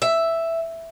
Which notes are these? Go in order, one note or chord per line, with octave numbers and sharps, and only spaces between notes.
E5